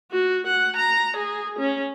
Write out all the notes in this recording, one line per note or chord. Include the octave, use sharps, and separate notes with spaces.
F#4
F#5
A#5
G#4
C#4